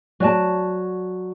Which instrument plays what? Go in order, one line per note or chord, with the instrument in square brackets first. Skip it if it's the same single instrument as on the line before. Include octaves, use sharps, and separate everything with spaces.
[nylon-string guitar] F#3 D5 G#5 A5